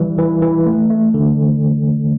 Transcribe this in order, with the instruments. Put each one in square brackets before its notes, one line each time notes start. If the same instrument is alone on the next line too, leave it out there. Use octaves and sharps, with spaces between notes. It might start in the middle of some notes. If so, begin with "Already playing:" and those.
Already playing: [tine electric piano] E3 G3
E3
E3
A3
A3
D3